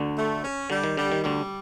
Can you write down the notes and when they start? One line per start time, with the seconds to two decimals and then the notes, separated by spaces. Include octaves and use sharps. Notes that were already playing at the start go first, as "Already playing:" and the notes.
Already playing: D2 D3
0.16 A3
0.43 C#4
0.69 D3 G3
0.84 D#3
0.96 D3 G3
1.12 D#3
1.23 D2 D3 G3